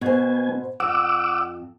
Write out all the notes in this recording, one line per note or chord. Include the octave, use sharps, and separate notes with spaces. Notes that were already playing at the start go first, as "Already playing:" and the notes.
B2 B3 C5 G#5
F2 F#5 D6 E6